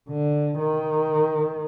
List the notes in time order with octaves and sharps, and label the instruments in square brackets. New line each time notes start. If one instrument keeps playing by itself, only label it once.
[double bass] D3
D#3